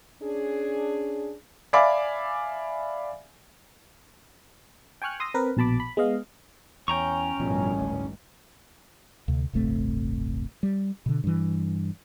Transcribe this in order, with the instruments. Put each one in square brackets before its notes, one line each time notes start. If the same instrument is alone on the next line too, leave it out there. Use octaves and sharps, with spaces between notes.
[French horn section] C#4 D4 G#4
[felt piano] D5 E5 F5 G#5 B5 D6
[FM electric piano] G5 G#5 C#6 F6 F#6
C6 D#6 E6 A#6
C4 A#4 B4
A#1 B2 A5 B5 D6
B5
G#3 B3 D#5 F5
[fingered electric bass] E2 [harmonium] C#4 [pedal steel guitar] G5 A#5 C#6
[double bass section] A1 G2 D#3 [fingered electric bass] B2 F3
[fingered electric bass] G#1 D2 A2
[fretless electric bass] D2 C3
D1 G1 C3 A3
G3
B2 D3
G2 E3